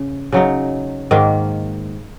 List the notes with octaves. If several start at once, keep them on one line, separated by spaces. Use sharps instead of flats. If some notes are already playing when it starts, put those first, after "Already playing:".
Already playing: C#3
C#3 F#3 D#4
G#2 D#3 A#3